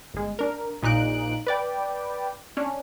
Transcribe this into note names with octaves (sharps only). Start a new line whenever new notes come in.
G1 G#3
D4 A#4
A#1 A#2 D#4 F#6 D7
B4 D5 G5
C#4 D4